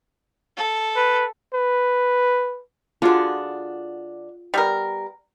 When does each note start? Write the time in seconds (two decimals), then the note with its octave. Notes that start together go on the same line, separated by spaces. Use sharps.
0.57 A4
0.96 B4
1.54 B4
3.02 D3 D4 F4 F#4 G#4
4.54 G3 B3 A#4